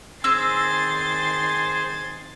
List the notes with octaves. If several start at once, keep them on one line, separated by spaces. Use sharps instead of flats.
D#3 C4 G#4 C5 G#5 C6 E6 A6